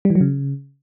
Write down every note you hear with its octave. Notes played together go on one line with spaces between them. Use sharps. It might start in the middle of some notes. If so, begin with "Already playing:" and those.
G3
E3
F#3
C#3